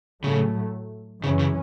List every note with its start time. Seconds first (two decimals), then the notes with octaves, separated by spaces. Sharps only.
0.24 A2 C#3 F#3 A3
1.22 F#2 C#3 E3 C#4
1.39 C#3